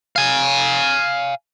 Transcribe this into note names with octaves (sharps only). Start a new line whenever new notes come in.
F5 G#5